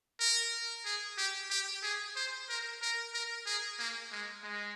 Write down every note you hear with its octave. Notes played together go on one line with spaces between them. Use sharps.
A#4
G#4
G4
G4
G#4
C5
A#4
A#4
A#4
G#4
A#3
G#3
G#3